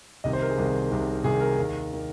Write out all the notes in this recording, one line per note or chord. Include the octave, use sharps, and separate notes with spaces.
C2 C3 D#3 D#5
C5
A#4
G#4
C2 C3 D#3
C2 C3 D#3
C2 C3 D#3 G#4
A#4
D#2 D#3
D#3